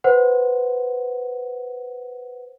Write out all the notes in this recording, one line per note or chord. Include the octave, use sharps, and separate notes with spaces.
B4 C5 F#5